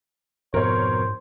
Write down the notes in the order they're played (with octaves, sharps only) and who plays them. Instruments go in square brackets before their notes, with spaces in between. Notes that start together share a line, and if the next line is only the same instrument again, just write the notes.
[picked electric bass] F2 B2 [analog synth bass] G#2 [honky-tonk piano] A#4 C#5 [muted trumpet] C5